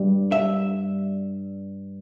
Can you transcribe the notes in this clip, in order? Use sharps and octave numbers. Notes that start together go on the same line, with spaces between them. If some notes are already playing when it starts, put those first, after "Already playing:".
Already playing: G2 G3
E5